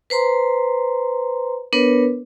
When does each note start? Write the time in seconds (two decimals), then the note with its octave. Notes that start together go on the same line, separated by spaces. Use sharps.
0.10 B4 C5 A#5 C6
1.73 B3 D4 A#4 B4 C#5